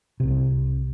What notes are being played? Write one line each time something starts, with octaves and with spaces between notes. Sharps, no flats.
C2 C3